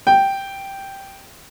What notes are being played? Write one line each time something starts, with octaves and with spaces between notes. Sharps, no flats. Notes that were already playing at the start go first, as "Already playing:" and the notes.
G5